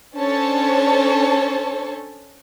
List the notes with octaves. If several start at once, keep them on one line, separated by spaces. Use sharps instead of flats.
C#4 D4 A4 C5 C#5 A5